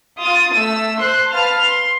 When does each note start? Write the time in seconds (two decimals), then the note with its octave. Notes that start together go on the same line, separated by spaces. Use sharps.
0.22 F4 D#6 A6
0.55 A3 E6
1.01 C5 C6 F#6
1.31 B4 F5 A5 F6
1.63 C6